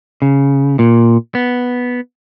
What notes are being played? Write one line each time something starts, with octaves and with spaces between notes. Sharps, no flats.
C#3
A#2
B3